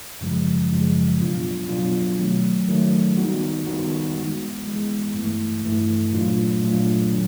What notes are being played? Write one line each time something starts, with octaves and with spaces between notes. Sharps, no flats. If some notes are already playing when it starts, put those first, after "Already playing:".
F#2 C#3 F3 G#3
F#2 C#3 F3 G#3
B2 F#3 B3 D4 F4
B2 F#3 B3 D4 F4
D#3 F#3 A3
D#3 F#3 A3
D#3 G3 B3 D#4 F#4
D#3 G3 B3 D#4 F#4
E3 G#3 B3
E3 G#3 B3
G2 E3 A3
G2 E3 A3
A#2 F#3 A3 D4 F4
A#2 F#3 A3 D4 F4
D#3 F#3